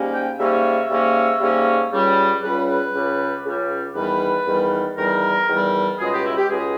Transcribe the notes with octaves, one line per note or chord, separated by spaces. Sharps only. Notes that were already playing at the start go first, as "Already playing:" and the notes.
Already playing: G#2 G3 A#3 C#4
G5
G#2 G3 A#3 C#4 E5
G#2 G3 A#3 C#4
G#2 G3 A#3 C#4
C#2 C#3 G3
C#2 C#3 G3 B4
B4
C#2 C#3 G3
C#2 C#3 G3
E2 D#3 G3 B4
E2 D#3 G3
E2 D#3 G3 A#4
E2 D#3 G3
C#2 B2 G#3 G#4
G4
E4
G4
C#2 B2 G#3 G#4